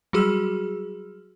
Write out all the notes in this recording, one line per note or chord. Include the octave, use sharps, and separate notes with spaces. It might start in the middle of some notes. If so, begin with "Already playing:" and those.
F#3 G3 F#4 G#4 E6 F6